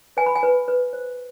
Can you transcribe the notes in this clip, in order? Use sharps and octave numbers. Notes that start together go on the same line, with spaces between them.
B4 G#5
B5
G#5
B4
B4
C5